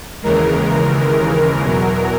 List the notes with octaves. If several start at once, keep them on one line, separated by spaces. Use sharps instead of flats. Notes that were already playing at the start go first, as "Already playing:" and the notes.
D#2 C#3 E3 G#3 A#4
E2 B2 F#3